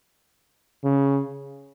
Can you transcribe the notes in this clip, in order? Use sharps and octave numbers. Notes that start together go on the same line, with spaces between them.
C#3